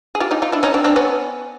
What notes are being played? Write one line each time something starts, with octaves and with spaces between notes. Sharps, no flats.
G#4
F4 G4
D#4 F4
D#4 F4
D4 E4
C#4 D#4
C4 D4
C4 D4
B3 C#4